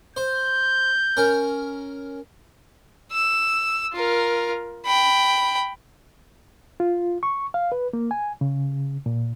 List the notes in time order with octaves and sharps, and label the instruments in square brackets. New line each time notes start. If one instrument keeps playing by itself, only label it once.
[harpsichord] C5 [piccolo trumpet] G6
[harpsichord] C#4 A#4
[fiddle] E6
F4 A#4
G5 B5
[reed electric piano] F4
C#6
F5
B4
A#3
G#5
C#3
A#2